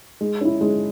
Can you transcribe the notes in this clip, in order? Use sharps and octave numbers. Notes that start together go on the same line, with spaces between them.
G#3
C#4 E4
G#3